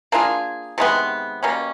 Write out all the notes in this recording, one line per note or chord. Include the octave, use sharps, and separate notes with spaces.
A#3 D4 F4 G#4
C3 D#3 G#3 B3
B2 G3 A#3 C#4